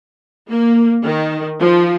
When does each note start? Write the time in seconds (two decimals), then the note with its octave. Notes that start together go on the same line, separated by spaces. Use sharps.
0.49 A#3
1.04 D#3
1.60 F3